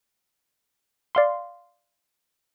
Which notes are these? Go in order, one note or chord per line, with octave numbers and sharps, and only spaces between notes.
D5 F5 C6